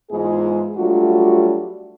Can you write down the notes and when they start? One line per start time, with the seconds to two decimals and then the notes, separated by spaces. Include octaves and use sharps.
0.11 E2 G#2 G#3 F4 G#4
0.77 F#3 G3 A3 D4 F4 F#4